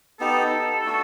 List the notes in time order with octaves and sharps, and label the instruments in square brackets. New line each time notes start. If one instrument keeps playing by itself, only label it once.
[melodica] B3 D#4 G4 [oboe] A4
[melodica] A3 D4 F#4